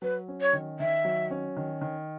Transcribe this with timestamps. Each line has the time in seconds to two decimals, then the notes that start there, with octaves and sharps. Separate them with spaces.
0.02 F#3 B4
0.28 C#4
0.41 C#5
0.53 D#3
0.80 D#3 E5
1.05 F#3
1.31 C#4
1.57 D#3
1.81 D#3